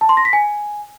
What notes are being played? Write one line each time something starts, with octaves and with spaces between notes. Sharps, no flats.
A5
C6
A#6
B6
G#5